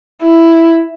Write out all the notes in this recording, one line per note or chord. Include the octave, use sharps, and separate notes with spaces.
E4